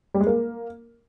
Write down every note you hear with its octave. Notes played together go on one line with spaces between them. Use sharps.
G3
G#3
A#3